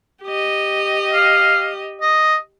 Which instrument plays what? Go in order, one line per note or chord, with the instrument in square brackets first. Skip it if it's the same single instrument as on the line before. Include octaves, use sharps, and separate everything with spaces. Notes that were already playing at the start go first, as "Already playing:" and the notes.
[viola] G4 D#5
[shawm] F5
D#5